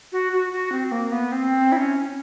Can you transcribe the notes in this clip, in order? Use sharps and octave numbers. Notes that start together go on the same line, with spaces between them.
F#4
F#4
F#4
C4
A#3
B3
C4
E4
C#4